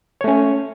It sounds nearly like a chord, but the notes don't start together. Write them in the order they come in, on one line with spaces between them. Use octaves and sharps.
C#5 A3 C#4